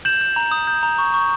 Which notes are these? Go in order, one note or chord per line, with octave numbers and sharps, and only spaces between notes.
G6 E7 F#7
G6
A#5
D#6
G6
A#5
C#6
C#6